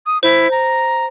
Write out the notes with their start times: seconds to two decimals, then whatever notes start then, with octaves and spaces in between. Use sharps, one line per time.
0.06 D#6
0.23 E4 C5
0.51 A#5